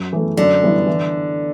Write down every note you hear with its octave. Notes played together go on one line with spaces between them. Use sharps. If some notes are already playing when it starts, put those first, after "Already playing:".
Already playing: F#2
E3 A3
F#2 D3
E3 G3 B3 E4
E3